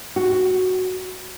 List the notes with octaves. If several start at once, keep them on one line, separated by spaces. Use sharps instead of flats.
F#4